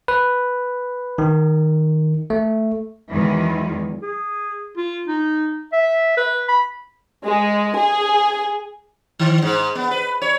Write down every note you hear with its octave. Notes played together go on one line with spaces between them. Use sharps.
B4
D#3
A3
E2 D#3 E3 F#3 G#3
G#4
F4
D#4
E5
B4
B5
G#3
G#4
D#3
G#2
B3
B4
C#5